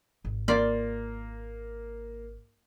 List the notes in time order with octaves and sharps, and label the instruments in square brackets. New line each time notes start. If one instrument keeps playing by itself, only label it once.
[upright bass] G#1
[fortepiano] A#3 [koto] F4 D5